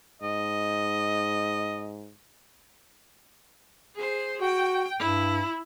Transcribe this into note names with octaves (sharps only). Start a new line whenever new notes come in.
G#2 D#5
G#4 C5
F#4 G5
G2 E4